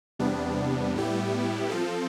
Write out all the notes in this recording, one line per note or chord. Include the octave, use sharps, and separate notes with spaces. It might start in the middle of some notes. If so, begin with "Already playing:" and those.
E2 C3 G3 B3 D4
A2 G3 B3 E4 G4
F3 C4 F4 A4